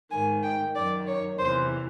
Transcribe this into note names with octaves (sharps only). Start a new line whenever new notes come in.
G#2 D#3 G#5
G5
F#2 D#3 D5
C#5
E2 C3 E3 C5